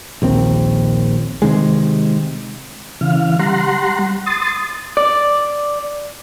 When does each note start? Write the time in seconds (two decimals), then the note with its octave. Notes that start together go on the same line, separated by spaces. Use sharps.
0.22 A#1 D#2 C4
1.42 C3 D#3 G#3
3.01 C#3 E3 F5
3.39 G3 F#5 A#5 C6
4.26 C6 D#6 A6
4.97 D5